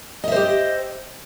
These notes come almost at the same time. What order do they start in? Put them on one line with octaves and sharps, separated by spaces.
D#5 E5 C5 G4